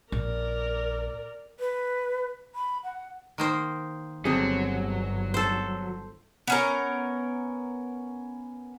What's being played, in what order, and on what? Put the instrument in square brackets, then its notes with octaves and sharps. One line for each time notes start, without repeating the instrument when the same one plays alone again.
[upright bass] A#1 [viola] A#4 D5
[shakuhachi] B4
B5
F#5
[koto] D#3 A#3 C5
[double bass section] G1 [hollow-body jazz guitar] D3 C4 G#4 [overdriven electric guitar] F#3
[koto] A4 C5
[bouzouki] B3 C#4 A#4